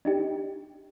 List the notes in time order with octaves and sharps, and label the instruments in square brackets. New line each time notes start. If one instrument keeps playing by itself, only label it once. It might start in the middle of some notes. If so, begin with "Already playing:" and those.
[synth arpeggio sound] D4 D#4 G4